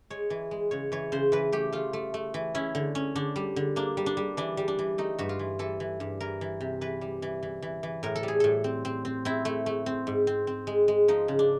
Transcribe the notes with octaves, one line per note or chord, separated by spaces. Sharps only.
G#3 C#5
E3
G#3
C#3 C#5
E3 C#5
C#3 C5
E3 B4
A3 G4
A3 F4
A3
A3
E3
C#4 E4
D3
C#4
D3 D4
G3
D3
A#3 D4
G3
D4
G3
E3 D4
G3
D4
E3
A3 D#4
G2 F#4
F4
E3
E3 A4
E3
G2
E3 A#4
E3
C3
E3 B4
G3
E3
E3
E3
E3
A2 A#4
A4
G3 G#4
A2 A4
C4
C4
C4
C4 E4
A3
A3
C4
G#2
C4
C4
G#3
G#3
F3 D#4
C#3
D4